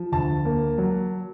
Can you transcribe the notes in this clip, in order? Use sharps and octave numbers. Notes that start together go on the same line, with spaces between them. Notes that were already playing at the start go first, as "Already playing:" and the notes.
Already playing: F3
D2 A5
A#3
F#3